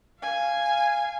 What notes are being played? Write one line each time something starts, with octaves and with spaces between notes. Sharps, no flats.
F5 G#5